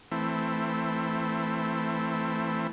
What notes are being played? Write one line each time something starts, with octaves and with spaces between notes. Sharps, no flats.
E3 A3 C4